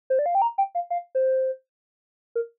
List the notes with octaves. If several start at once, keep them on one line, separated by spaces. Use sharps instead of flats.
C5
D5
F5
G5
A#5
G5
F5
F5
C5
A#4